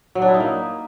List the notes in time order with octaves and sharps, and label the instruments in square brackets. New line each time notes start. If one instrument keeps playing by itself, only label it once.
[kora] F#3
D4
E4
D#4
A#3